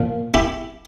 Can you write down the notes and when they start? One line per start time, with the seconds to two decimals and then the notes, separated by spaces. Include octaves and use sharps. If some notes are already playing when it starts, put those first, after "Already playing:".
Already playing: A#2 F3
0.34 E4 G4